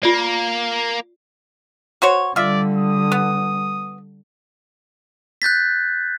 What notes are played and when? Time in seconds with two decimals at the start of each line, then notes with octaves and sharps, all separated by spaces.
0.03 A#3 F4 D5
2.02 F#4 C5 C#5
2.36 D3 G3 F4 D5 E5
2.77 D#6
3.12 B3
5.42 F#6 G6 A6 B6